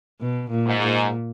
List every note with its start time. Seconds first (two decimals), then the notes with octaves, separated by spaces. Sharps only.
0.21 B2
0.51 A#2
0.67 G#2
0.81 A#2